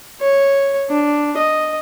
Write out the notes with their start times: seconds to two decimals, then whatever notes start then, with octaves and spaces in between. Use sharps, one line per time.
0.21 C#5
0.90 D4
1.38 D#5